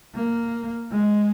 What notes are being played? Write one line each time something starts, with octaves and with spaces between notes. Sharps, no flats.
A#3
G#3